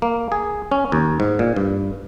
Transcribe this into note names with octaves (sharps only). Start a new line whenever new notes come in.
A#3
G#4
C#4
D#2
G#2
A#2
G2